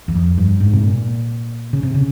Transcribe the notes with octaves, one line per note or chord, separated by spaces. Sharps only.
E2
F2
G2
G#2
C3
A#2
C#3
C3
C#3